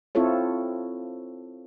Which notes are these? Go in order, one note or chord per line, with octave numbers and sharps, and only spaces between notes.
C4 E4 F4 A4 C#5